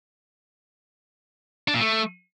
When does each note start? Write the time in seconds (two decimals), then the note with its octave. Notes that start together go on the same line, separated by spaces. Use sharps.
1.68 D4
1.74 A#2
1.80 A3